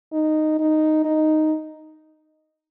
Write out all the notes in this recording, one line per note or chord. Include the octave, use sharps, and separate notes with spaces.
D#4
D#4
D#4